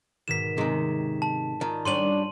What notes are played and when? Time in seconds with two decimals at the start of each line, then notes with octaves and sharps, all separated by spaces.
0.28 G#2 B2 D#3 B6 E7
0.58 C3 D#3 G#3 C#4 D#4
1.22 A5
1.61 D#3 F4 D5
1.85 G3 C#4 D4 C6 D#7 F#7